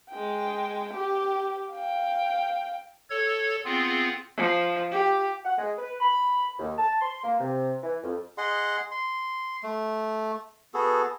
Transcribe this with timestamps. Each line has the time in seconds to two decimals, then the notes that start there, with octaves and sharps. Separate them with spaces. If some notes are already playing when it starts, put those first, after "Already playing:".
0.11 G#3 G5
0.94 G4
1.73 F5 G5
3.10 A4 C#5 G#6
3.65 B3 C4 F4 G#4
4.37 F3
4.92 G4
5.45 F#5
5.58 G#3
5.78 B4
6.00 B5
6.59 D#2
6.78 A5
7.01 C6
7.24 A#3
7.40 C3
7.83 E3
8.03 F2
8.38 G#4 D#5 F#5 C6
8.91 C6
9.63 A3
10.74 B3 F#4 G#4 A4